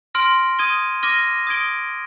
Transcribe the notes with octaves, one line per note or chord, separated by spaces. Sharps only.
C6 F6 A#6 D7
D#6 G#6 D#7 G7
D6 F6 A#6 D#7 G7
D#6 G#6 D7 G7